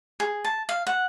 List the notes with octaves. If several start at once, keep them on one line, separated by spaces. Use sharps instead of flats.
G#4
A5
F5
F#5